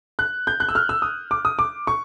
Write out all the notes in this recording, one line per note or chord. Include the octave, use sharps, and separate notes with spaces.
F#6
G6
F#6
E6
F6
E6
D#6
D6
D#6
D6
C#6